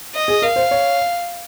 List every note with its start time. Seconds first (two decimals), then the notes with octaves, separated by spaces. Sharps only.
0.14 D#5
0.28 G#4
0.42 A#4 F5
0.56 C5
0.71 C#5